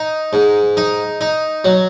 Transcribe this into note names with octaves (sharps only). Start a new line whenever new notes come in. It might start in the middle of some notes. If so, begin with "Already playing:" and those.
Already playing: D#4
G#2
D#4
D#4
F#3